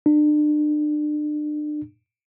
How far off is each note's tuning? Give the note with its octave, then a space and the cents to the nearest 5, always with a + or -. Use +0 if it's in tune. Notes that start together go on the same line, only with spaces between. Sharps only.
D4 +35